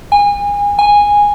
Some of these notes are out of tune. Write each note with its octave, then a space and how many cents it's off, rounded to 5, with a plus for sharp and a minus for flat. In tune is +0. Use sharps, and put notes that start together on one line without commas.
G#5 -30
G#5 -10